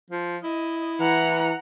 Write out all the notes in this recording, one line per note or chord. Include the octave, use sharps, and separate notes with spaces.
F3
E4 D#5
E3 F#5 A#5